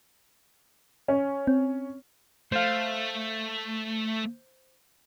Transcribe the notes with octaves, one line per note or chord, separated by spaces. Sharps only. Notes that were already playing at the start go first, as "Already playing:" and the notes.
C#4
C4
A3 C5 F5